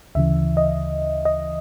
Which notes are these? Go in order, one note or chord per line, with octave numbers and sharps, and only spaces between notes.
D2 C#3 E3 E5
D#5
D#5